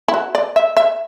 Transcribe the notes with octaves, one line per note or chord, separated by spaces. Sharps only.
E4
F#4
D5
E5
E5